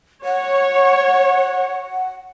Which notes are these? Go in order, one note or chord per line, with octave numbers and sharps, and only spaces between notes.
C#5 F#5